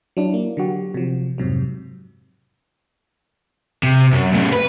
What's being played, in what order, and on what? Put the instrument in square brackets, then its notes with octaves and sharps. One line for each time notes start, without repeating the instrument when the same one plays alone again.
[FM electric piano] F#3 D4 E4
A#3
D3 F#3 F#4 G4
C3 F3
F2 G#2 C3 F#3
[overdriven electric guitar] C3
F#2
A2 C#3
B4